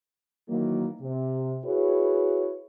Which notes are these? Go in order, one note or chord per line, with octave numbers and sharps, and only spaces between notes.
D#3 E3 F#3 A#3
C3
E4 F#4 G#4 B4 C#5